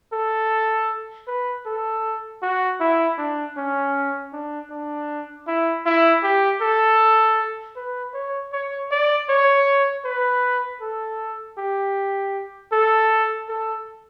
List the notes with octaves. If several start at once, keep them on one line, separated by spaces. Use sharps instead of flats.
A4
B4
A4
F#4
E4
D4
C#4
D4
D4
E4
E4
G4
A4
B4
C#5
C#5
D5
C#5
B4
A4
G4
A4
A4